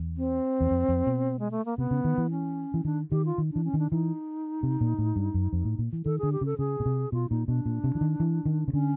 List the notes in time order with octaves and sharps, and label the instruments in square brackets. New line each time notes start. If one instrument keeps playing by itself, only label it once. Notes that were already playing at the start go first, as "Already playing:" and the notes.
Already playing: [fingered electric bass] E2
[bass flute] C4
[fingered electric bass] E2
F2
F2
B2
[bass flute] G#3
A3
A#3
[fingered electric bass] C3 [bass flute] B3
[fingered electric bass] C#3
D#3
E3
[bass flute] C#4
[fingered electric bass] E3
[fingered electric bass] D#3 [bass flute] D4
[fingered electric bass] D#3 [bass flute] G4
[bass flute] F4
[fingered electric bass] D#3
[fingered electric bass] E3 [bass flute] D4
[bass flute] C#4
[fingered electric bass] D#3
[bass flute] D4
[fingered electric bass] E3 [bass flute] D#4
[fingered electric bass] C3
A#2
A2
G2
F#2
F2
A2
A#2
E3
[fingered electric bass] D#3 [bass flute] A4
[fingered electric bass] D3 [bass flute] G#4
[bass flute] G4
[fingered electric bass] C#3 [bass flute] A4
[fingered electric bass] C#3 [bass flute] G#4
[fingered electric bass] B2
C3
[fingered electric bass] B2 [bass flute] F4
[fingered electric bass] A#2 [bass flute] D#4
[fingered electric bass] B2 [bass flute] D4
[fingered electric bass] A#2
C3
E3
D#3
E3
D#3
C#3
[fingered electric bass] D3 [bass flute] C#4